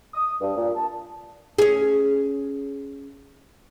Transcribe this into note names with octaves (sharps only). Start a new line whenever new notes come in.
D#6
G2
A#2
A5
C#4 G#4